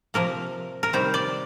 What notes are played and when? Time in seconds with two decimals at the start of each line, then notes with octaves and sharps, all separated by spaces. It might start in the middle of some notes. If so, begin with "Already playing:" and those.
0.14 C3 F3 A#3 A#4
0.83 A#4
0.93 C3 D#3 G3 C5
1.14 D5